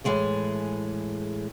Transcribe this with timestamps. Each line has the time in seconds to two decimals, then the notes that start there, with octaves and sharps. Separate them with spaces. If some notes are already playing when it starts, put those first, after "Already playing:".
0.04 A2 E3 G#3 G#4 A4